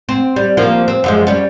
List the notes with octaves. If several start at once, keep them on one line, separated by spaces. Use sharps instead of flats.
C4
G3
F3 A#3 F4
C4
F#2 F3 G#3
G3 C#4